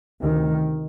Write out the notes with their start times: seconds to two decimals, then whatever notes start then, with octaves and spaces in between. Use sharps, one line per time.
0.22 D2 C3 D#3